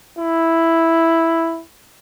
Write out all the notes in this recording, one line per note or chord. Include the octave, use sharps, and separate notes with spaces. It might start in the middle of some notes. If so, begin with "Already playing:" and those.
E4